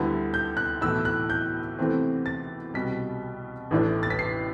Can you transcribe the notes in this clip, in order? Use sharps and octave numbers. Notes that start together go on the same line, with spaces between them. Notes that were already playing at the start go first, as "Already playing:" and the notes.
Already playing: D2 D3 G3 B3 E4
G6
F#6
B1 A2 E3 A3 E4 E6
F#6
G6
E2 C3 E3 A3 C4
A6
C2 B2 G3 B6
A1 A2 E3 A3 D4
A6
B6
C7